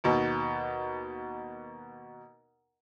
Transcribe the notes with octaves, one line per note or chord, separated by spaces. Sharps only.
D#2 B2